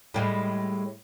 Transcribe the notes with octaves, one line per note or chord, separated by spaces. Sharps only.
A2 G3 G#3